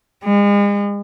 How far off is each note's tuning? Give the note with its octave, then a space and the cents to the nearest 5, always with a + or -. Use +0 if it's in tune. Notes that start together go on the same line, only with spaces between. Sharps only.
G#3 -40